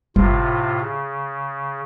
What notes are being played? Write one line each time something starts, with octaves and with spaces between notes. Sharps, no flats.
G1 A2 C3 F4
C#3